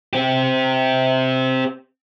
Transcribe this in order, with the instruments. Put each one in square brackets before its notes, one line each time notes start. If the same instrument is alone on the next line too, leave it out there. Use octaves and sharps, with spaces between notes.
[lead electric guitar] C4 G4